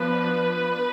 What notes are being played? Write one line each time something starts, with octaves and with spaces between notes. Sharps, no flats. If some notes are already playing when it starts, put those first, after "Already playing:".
Already playing: F3 B3 D4 B4